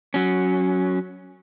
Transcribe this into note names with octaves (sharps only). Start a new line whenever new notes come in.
F#3 C#4